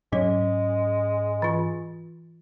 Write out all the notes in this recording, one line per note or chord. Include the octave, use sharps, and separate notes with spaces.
G#2 F#3 G#3 C#4 C#5
E3 F4